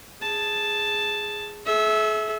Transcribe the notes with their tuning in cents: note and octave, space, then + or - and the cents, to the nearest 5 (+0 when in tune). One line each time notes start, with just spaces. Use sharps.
G#4 +0 A5 +0
G#4 +45 E5 -15